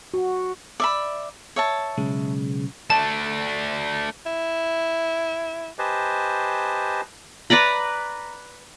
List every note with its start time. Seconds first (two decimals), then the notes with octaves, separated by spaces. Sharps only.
0.14 F#4
0.80 D5 E5 B5
1.56 C#5 E5 A5
1.98 B1 C#3 G#3
2.90 A3 D4 A5
4.26 E4
5.79 G4 B4 C5 D#5 G#5 A5
7.50 B4 D5 A#5 B5